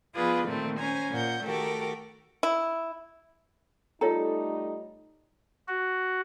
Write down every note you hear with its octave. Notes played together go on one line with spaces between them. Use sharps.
F3 B3 F4 G#4 B4 D5
A#2 D#3 A3 A#3 C4
C#4 C5 G#5 A#5
A#2 F#5 G6
D#3 A3 F#4 G4 A4 A#4
E4
G3 A3 D#4 F4 A4 C#5 A#5
F#4